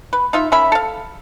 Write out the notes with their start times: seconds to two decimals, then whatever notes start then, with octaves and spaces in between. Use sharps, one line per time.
0.13 B4
0.33 D#4 F4 E5
0.52 C#4 A#4 E5 B5
0.72 A4 F5